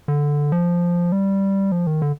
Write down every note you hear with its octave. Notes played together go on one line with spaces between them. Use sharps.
D3
F3
G3
F3
D#3
D3